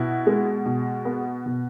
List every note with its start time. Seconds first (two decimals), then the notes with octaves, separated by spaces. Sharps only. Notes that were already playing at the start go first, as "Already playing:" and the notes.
Already playing: B2 B3 E4
0.27 G#3
0.66 B2
1.05 B3
1.46 B2